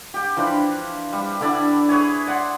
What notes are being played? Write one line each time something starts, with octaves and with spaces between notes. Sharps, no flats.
G4 G5
E3 F3 D4 B4
G3
D3 D4 E4 D5
G#4 B4 C#5 G#5
D5 F#5 C6